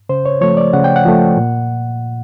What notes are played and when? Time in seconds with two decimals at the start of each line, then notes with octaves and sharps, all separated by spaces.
0.09 C#3 C5
0.26 C#5
0.41 F3 A3 C#5
0.57 D5
0.73 C#3 F#5
0.84 G5
0.96 F#5
1.05 F3 A3
1.37 A#2